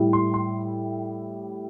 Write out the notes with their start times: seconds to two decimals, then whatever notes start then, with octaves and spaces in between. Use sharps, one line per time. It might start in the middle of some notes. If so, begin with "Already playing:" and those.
Already playing: A2 G3 E4
0.13 C6
0.34 C6